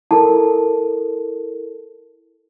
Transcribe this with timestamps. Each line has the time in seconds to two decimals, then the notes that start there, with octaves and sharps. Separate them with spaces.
0.11 E4 A4 A#4 A5